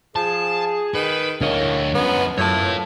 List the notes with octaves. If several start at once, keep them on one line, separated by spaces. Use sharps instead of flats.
F3 G#4 A5
D#3 B4
D2 A2 A#3 D4 C#5 D#5
B2 F3 F#3 G#3 B3 C#4
F#2 A2 B3 F4 C#5 A5